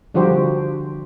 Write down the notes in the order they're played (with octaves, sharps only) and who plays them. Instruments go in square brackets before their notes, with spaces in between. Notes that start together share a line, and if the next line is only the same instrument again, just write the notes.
[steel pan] D3 F3 G3 F#4 G4 C5